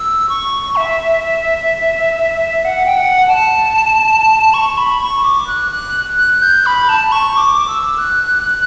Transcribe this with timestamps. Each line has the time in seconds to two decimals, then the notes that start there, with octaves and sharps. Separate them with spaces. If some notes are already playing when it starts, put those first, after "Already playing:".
Already playing: E6
0.29 C#6
0.76 E5
2.65 F#5
2.86 G5
2.97 F#5
3.28 A5
4.54 C#6
4.78 B5
5.01 C#6
5.24 D6
5.47 F#6
5.71 F#6
6.18 F#6
6.42 G6
6.66 B5
6.89 A5
7.12 C#6
7.37 D6
7.68 E6
7.98 F#6